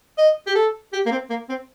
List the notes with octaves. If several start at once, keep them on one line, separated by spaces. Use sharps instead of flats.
D#5
G4
A4
G4
A#3
C4
A#3
C4